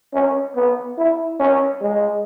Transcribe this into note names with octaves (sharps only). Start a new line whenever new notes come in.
C#4
B3
E4
C#4
G#3